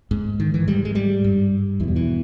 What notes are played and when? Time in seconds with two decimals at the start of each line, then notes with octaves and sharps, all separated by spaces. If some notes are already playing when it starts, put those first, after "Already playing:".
0.11 G#2
0.40 D#3
0.54 E3
0.68 G#2 G3
0.85 G#3
0.95 G3
1.24 G2
1.80 E2 E3
1.83 B2 G3
1.96 E3